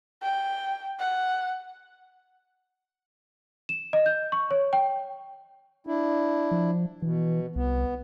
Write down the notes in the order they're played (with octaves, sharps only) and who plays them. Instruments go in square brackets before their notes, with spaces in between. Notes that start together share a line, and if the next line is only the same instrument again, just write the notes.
[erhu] G5
F#5
[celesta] E7
D#5
G6
C#6
C#5
G5
[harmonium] D4 E4
[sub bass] F3
[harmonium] B2 [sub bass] E3
[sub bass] C2 [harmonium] B3